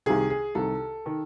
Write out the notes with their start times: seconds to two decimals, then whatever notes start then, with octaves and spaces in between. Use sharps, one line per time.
0.06 C2 C3 D#3 G#4
0.30 G#4
0.55 C2 C3 D#3 A4
1.06 D#3